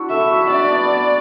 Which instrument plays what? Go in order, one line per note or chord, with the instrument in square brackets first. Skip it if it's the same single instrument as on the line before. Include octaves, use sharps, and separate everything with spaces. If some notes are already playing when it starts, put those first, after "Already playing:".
Already playing: [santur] D4 E4 F#4
[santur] A4 [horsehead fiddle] E5
[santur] F#4
[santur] D4 [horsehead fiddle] D5
[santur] B3